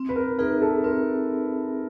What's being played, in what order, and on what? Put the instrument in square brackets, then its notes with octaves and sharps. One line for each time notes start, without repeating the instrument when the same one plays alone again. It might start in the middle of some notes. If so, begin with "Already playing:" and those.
Already playing: [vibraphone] C4
[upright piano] B4
A#4
[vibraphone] D#4 G#4 B4 E5 [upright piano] A#4
[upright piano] A4
[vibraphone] C4 [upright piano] A#4